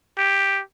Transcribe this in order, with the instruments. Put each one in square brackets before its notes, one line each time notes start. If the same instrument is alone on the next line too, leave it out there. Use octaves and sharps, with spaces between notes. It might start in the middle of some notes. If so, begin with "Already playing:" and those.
[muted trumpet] G4